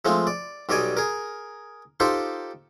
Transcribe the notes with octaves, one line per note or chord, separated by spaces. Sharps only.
F3 G#3 A3 C4 F4
D5
B1 G3 D5 D#5 G#5
G#4 A#4
D#4 F4 G4 A4 C5